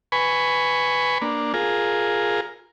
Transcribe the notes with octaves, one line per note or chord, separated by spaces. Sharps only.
B4 G#5 B5 C#6
A#3 D4
F4 G#4 A#4